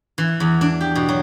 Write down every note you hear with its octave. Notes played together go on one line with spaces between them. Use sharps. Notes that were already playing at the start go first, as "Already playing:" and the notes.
E3
E2
D4
G4
B2
F#3